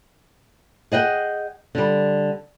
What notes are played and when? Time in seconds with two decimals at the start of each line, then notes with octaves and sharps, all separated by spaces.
0.92 G#4 D#5 F#5 G5
1.75 D3 G3